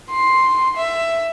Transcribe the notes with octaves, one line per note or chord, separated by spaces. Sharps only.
C6
E5